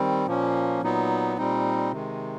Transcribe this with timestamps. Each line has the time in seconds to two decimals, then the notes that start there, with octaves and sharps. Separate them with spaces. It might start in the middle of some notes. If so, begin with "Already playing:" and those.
Already playing: D#3 G3 C4
0.27 A#2 F3 A#3 C#4
0.82 A#2 F#3 B3 D#4
1.37 A#2 G3 C4 D#4
1.92 C3 D#3 G#3